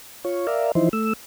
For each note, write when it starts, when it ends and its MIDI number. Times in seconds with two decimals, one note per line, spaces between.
0.25 0.47 65
0.25 0.47 73
0.47 0.72 70
0.47 0.72 74
0.47 0.72 76
0.47 0.72 77
0.75 0.89 52
0.75 0.89 53
0.75 0.89 63
0.75 0.89 64
0.75 0.89 72
0.93 1.13 57
0.93 1.13 88